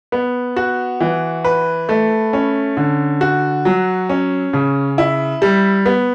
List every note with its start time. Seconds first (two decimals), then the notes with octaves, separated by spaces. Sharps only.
0.12 B3
0.56 F#4
1.00 E3
1.45 B4
1.89 A3
2.33 C#4
2.77 D3
3.21 F#4
3.65 F#3
4.09 C#4
4.53 C#3
4.98 E4
5.42 G3
5.86 B3